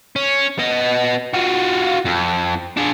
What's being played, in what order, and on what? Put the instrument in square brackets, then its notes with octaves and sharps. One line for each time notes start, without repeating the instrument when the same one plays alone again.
[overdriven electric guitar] C#4
B3 D#5
F4 F#4
F2
D4 G#4